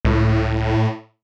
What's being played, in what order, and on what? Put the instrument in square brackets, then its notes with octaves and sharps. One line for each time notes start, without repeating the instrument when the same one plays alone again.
[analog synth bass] C#2 [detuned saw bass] A2